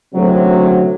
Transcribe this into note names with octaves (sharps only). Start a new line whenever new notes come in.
F#1 D2 C3 F#3